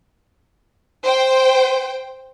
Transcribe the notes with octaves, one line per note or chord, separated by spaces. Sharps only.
C5 G5